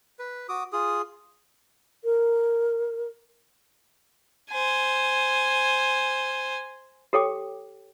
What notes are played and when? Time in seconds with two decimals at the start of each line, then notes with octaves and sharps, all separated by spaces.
0.19 B4
0.49 F#4 D6 D#6
0.73 F4 G#4 D#6
2.04 A#4
4.51 C5 G#5
7.13 G4 A4 C#5 G5 D6